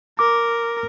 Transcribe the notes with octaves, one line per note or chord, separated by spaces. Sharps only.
A#4 D6